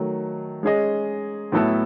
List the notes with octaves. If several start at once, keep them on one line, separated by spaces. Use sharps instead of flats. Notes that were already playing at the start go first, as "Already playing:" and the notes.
Already playing: D#3 F#3 A3
G#3 C#4 G#4 D#5
A2 F#3 B3 E4 A4